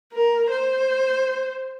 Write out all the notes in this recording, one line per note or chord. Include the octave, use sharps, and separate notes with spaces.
A#4
C5